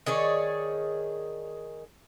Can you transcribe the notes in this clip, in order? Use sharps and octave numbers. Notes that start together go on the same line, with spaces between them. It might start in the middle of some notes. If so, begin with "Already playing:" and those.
D#3 G#4 C#5 D5